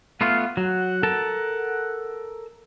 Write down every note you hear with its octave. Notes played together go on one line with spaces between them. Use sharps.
A3 B3 F4 F5
F#3 F#5
A4 A#4 A5